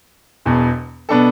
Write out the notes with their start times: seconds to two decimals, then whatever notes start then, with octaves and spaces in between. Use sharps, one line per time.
0.46 E1 E2 B2
1.09 B2 B3 D4 A4